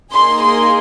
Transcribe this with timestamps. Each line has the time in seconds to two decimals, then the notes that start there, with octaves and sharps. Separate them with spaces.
0.14 A#3 D#4 G#4 C6
0.42 C6